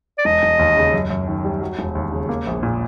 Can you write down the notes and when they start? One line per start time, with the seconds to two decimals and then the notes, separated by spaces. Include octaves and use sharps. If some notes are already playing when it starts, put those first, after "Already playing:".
0.18 D5
0.25 E1 D#5
0.43 E1
0.59 D#2
0.77 C#3
0.93 F#2
1.10 F#2
1.28 D#3
1.44 G3
1.61 F#3
1.79 E1
1.95 D#2
2.12 C#3
2.29 A#3
2.47 A#1
2.63 A#2